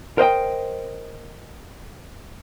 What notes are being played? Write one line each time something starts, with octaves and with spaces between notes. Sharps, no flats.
A#4 C5 D#5 G5